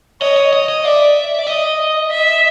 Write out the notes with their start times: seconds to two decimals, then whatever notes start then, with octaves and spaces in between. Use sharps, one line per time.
0.21 C#5 D#5
0.37 D#5
0.53 D#5
0.69 D#5
0.84 D5 E5
1.39 D5
1.47 D#5
2.11 E5